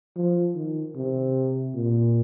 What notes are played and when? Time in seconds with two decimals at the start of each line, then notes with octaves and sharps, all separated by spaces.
0.16 F3
0.55 D#3
0.96 C3
1.75 A#2